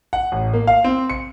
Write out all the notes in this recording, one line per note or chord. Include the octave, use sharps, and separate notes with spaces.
F#5
A1
A#3
F5
C4
C#7